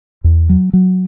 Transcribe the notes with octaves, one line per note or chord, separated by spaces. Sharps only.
E2
F#3
F#3